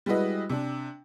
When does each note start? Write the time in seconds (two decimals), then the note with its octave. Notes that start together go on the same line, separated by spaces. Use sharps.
0.06 G3 G#3 E4 F#4 B4 D#5
0.49 C3 D4